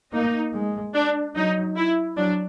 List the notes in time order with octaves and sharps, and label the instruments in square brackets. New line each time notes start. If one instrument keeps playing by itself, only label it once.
[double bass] A#3 [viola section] D#4
[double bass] G#3
[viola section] D4
[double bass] F#3 [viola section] D#4
[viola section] E4
[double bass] F#3 [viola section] D4